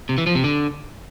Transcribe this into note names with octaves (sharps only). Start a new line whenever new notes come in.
C3
E3
F3
C3
D3